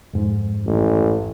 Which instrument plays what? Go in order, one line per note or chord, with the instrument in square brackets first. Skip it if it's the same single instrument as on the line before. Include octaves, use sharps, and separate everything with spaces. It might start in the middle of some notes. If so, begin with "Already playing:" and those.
[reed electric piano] F2 G#2
[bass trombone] A1